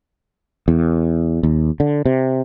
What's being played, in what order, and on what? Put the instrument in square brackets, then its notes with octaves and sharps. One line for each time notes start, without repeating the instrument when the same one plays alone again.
[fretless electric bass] E2
D#2
D3
C3